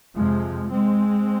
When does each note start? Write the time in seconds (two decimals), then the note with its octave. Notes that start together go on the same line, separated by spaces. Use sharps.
0.15 F2 C3 F3 G#3
0.71 G#3 C4